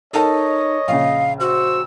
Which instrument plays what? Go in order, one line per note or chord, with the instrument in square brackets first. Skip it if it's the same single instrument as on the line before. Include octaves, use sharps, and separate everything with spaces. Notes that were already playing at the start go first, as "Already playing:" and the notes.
[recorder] D#4 [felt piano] A4 A#4 A5 [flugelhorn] C#5 [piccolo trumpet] D#5
[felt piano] A#1 C#3 [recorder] F5
[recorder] F#4 [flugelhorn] C5 [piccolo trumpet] E6